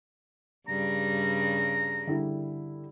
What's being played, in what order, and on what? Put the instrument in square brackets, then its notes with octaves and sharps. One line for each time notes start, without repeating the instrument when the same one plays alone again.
[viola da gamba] G2 C#3 G3 [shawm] A#5
[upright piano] D3 G3 E4